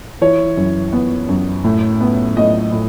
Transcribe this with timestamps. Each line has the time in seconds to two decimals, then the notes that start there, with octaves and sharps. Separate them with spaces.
0.21 E3 C#5
0.57 F#2
0.93 B3
1.29 F#2
1.64 A2
2.01 B3
2.37 A2 D#5
2.72 A2